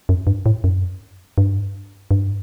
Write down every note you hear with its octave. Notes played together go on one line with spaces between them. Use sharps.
F#2
G2
A2
F#2
G2
G2